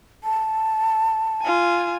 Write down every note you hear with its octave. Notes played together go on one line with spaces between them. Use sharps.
A5
F4 G#5